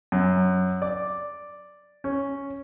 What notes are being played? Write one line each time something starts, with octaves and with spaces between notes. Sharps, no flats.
F#2
D5
C#4